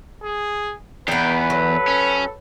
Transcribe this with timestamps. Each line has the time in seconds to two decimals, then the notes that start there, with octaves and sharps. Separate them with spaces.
0.23 G#4
1.08 E2 B3 D#4 B4 G5
1.50 F#3 A4
1.88 C#4